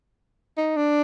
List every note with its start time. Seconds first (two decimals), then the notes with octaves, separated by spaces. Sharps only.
0.57 D#4
0.76 D4